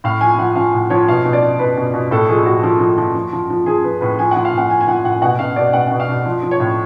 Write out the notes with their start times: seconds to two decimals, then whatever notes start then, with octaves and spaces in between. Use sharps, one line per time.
0.04 A2 F5
0.21 F3 G#5
0.39 F3 F#5
0.56 F3 F5
0.73 A2
0.90 F3 C#5
1.08 B2 F5
1.25 B2
1.33 D5
1.42 B2
1.59 B2 B4
1.77 B2
1.94 B2
2.11 A2 A4
2.29 F3 G#4
2.45 A2 F#4
2.63 F3
2.80 F3
2.98 F3
3.15 F3
3.33 F3
3.50 F3
3.66 F3 G#4
3.84 F3 B4
4.01 A2 B4
4.19 F3 G#5
4.31 F3 F#5
4.45 F5
4.52 A2
4.58 F#5
4.70 F3 G#5
4.81 G#5
4.88 F3 F#5
5.04 A2 F#5
5.22 B2 F#5
5.39 B2 F5
5.56 B2 D5
5.73 B2 F#5
5.87 B2 F#5
6.00 F5
6.09 B2
6.26 F3
6.43 F3
6.51 C#5
6.60 A2